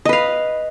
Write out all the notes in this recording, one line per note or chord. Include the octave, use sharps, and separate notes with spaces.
B4 D#5 F5